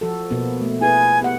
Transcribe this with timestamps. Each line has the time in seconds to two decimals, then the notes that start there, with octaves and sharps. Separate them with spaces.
0.01 F3 F#4 A4
0.31 B2 A#3 B3
0.61 A3
0.81 E4 G#4 B4 G#5
1.21 B3 G4 F#5